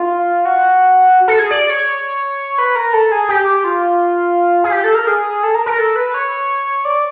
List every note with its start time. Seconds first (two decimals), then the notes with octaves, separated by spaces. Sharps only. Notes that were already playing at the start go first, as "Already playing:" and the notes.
Already playing: F4
0.45 F#4
1.28 A4
1.39 G#4
1.51 D5
1.70 C#5
2.58 B4
2.76 A#4
2.93 A4
3.12 G#4
3.29 G4
3.64 F4
4.64 G#4
4.72 G4
4.84 A4
4.95 A#4
5.07 G#4
5.43 A4
5.55 A#4
5.66 A#4
5.78 A4
5.96 B4
6.14 C#5
6.85 D5